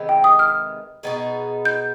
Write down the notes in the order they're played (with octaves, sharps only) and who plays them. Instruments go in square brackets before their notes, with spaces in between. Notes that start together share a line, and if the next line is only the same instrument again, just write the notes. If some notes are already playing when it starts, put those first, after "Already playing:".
Already playing: [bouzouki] C3 D#3 G#3 B3
[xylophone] G5
D#6
F6
[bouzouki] B2 B3 D#4 G#4
[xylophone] G6